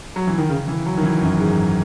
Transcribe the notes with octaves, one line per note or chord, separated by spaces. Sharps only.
F#3
E3
D#3
C#3
E3
F#3
D#3
E3
F#2
G#2